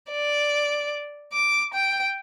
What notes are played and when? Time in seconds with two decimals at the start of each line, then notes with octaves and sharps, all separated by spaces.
0.11 D5
1.33 D6
1.74 G5